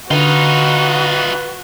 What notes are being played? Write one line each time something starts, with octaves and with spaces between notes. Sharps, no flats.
D3 D#4 F4 F#4 B4